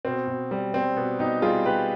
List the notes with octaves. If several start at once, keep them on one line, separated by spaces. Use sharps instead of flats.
B2 C4
B2
G3
G3 C4
B2 B3
B2 D#4 G4
G3 F4 G#4
G3 G4 B4